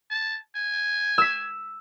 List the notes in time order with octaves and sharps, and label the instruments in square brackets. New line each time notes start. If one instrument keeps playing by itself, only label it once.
[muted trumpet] A5
G#5
[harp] E6 B6